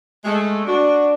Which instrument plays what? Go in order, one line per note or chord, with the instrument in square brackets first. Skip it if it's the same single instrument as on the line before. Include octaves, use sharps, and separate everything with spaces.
[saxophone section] G#3 [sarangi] A3
[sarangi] D4 [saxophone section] F#4